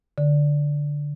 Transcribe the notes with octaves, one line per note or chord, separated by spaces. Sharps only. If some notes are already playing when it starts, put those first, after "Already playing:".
D3